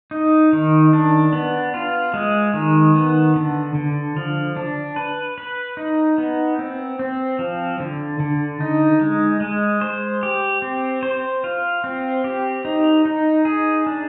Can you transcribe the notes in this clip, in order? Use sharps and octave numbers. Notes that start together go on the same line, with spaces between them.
D#4
D#3
D4
B3
F4
G#3
D#3
B3
D3
D3
F3
D4
B4
B4
D#4
B3
C4
C4
F3
D3
D3
D#4
G#3
G#3
C5
G4
C4
C5
F4
C4
G4
D#4
D#4
G#4
D4